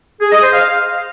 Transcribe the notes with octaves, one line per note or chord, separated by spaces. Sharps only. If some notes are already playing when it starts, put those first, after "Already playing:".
G#4
D#5
C5
F5